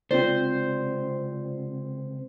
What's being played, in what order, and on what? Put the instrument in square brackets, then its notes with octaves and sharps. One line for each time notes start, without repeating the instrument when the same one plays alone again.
[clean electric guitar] C#2 C3 [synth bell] C4 F4 D5 [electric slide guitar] C5